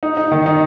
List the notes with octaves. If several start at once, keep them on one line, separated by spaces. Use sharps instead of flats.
D#4
D#4
D#3
D#4